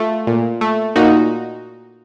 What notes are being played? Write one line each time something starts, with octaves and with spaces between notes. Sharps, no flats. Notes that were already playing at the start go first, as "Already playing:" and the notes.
Already playing: A3 F4
A#2
A3
A#2 D#4 F#4